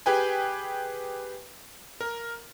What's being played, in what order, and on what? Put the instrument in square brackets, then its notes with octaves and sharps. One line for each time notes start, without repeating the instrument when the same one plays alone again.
[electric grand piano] G4 G#4 B4 G5 G#5
A#4